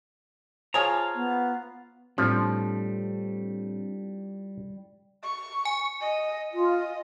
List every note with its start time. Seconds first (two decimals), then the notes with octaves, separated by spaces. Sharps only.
0.74 F3 F4 G#4 C#5 A#5
1.15 B3
2.18 A2 F3 G3 C4 D4
5.23 C#6
5.65 G#5
6.01 D#5
6.53 F4 D#5